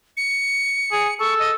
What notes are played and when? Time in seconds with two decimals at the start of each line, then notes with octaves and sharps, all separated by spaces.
0.17 C#7
0.92 G#4
1.20 A4 C#6
1.39 D#5